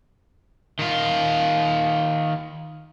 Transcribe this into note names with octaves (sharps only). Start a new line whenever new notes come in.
D#3 F4